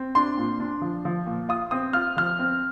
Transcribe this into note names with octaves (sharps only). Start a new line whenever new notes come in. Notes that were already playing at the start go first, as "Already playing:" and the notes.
Already playing: C4
D4 C6
A#2
D4
F3
F3
A#2
F4 D#6
C4 D#6
F4 F6
F3 F6
C4